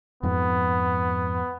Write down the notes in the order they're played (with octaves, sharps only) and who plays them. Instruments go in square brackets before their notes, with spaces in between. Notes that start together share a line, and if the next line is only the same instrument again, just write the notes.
[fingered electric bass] F2 G#2 F3 [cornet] B3